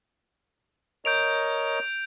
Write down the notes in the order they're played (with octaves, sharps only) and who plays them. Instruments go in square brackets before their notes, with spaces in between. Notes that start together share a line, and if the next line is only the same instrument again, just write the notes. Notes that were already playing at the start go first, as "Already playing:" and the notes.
[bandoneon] A#4 C#5 D#5 [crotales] G6 D7 F7